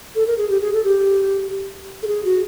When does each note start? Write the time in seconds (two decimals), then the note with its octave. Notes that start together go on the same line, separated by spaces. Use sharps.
0.15 A4
0.27 A#4
0.38 G#4
0.49 G4
0.61 G#4
0.73 A4
0.84 G4
2.03 A4
2.07 G#4
2.25 F#4